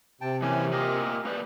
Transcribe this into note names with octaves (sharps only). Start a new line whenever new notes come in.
C3 G5 A5
E3 A#3 C#4 G#5
A#3 F4 G4 A#4 D#5 G#5
A#3 B4 D5